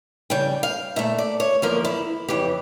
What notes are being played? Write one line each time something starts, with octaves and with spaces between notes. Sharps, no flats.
F2 C#3 G3 G5
F5
A#2 A3 E5
D5
C#5
E2 D3 F3 A#3 A#4
E4
F2 C#3 E3 G4